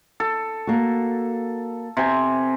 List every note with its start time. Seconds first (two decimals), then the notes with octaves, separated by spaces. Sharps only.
0.20 A4
0.67 A#3 F#4
1.97 C3 G#5